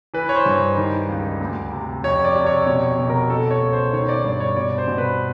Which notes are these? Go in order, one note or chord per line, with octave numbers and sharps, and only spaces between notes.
E3 B4
C#5
C5
G2
D#3
C#2
D2
C3
F2 C#5
D5
C3
C#5
B2 C#5
B2
A#4
B2 A4
C#5
C#2
C5
D#3 C#5
D5
G2 D5
C#5
B2 D5
C5
B2
B4